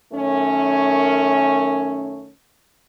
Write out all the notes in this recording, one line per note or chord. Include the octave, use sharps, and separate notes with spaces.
F#2 D#3 A3 C#4